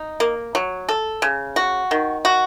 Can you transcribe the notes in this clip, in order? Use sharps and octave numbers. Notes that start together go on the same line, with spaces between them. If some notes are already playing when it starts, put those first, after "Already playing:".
Already playing: D#4
A#3
F#3
A4
C#3
F#4
D#3
F#4